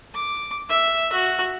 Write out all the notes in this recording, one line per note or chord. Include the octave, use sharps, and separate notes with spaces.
D6
E5
F#4